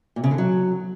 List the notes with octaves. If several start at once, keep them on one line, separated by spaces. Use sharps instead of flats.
A#2
C#3
D3
F#3